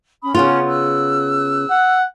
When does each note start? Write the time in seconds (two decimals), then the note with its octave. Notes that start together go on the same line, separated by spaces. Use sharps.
0.21 C#4 B5 D#6
0.35 C#3 B3 C#4 F4 F#6
0.67 E6 F#6
1.70 F#5